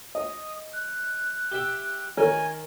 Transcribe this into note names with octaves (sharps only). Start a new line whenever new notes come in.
D#5 D#6
F#6
G4 E5 G5
D#3 A#4 C#5 G#5